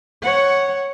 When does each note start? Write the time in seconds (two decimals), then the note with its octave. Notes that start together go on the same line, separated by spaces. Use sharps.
0.23 C#5 F#5